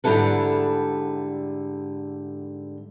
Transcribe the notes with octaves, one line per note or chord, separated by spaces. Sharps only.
G#2 D3 G3 E4 A4 B4